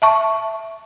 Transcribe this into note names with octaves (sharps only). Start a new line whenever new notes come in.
E5 A5 C#6